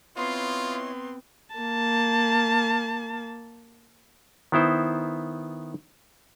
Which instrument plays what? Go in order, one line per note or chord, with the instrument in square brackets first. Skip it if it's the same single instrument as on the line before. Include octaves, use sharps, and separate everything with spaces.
[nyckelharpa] B3 C4 [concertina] E4 C#5 D#5 [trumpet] F4 [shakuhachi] C6
[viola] A#3 A5
[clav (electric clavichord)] D#3 B3 E4 C5